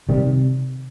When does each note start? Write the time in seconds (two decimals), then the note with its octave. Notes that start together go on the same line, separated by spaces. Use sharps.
0.09 C3 D#3 G3